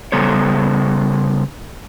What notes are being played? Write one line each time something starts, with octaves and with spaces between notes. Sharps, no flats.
C#3 G3 B3 A4 C5 C#5